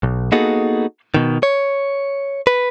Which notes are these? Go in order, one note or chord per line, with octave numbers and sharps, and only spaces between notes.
B1
A#3 B3 D#4 F#4 G#4 A4
B2 D#3
C#5
B4